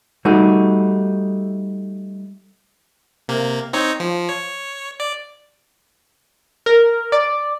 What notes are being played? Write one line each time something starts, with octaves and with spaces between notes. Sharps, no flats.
G3 A3 D#4 F#4
C3 A#3
C4 D#4 C#5
F3
C#5
D5
A#4
D5